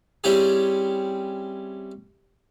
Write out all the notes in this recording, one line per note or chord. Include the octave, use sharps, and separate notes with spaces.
G3 C4 C#4 E4 G4 G#4